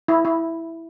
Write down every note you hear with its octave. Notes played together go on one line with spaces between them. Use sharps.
E4
E4